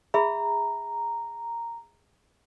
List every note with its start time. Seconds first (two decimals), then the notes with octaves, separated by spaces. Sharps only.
0.14 G#4 E5 A#5 B5